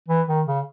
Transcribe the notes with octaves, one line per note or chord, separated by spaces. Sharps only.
E3
D#3
C#3